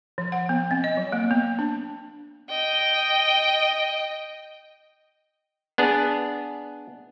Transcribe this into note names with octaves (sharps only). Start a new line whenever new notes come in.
F3
F#5
B3
C4
D#5
F#3
A#3
B3
D4
D#5 G5
B3 D4 G#4